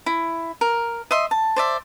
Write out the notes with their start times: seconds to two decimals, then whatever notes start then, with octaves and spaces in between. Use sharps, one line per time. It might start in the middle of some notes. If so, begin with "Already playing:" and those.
0.06 E4
0.61 A#4
1.11 D#5 E5 C6
1.31 A5
1.56 C5 D5 E5